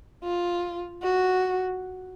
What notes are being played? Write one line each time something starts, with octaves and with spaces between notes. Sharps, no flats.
F4
F#4